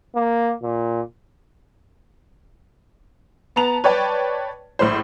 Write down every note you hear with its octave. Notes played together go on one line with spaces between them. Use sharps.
A#3
A#2
B3 A5 A#5 F7
B4 C#5 D5 G5 A5
A#1 A2 C5